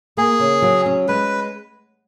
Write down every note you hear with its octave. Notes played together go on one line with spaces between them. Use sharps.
A#3 G#4
C#3
F#3
C#4
G#3 B4